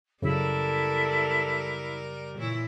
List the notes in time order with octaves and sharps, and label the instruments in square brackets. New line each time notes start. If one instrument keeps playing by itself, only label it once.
[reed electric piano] F#2 C#3 [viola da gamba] G3 A#4 [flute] E4 [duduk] A4
[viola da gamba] A#2 E3 E4 [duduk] C#5